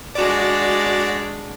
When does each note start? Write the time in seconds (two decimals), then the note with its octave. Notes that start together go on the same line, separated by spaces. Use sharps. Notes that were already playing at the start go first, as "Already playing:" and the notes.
0.15 G#3 D4 F#4 D5